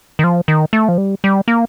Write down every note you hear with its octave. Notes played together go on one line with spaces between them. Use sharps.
D#3
F3
D#3
A3
F3
G3
G3
A#3